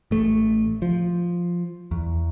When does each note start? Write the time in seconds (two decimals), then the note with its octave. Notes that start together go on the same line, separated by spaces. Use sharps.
0.11 A1 A3
0.82 F3
1.91 E2